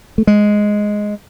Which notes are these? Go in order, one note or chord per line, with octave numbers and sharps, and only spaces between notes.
A3
G#3